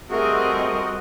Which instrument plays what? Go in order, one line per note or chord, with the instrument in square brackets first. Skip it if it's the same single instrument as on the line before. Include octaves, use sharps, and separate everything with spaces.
[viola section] G3 C4 D#5 [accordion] A3 G#4 [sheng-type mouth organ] F#4 [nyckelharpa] A#4